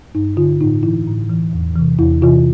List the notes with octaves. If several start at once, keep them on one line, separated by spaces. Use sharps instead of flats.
G2 D#4
D3 F4
A2 D#4
E3 E4
A2
E3
E2
C3 E3
E2 E4
C3 E3 F4